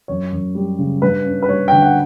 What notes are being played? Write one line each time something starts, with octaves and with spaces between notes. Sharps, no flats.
F#2 C#5
F#2
G3
C#3
G2 B4
C#4
B4
G3 C#5
D3 G5
F#5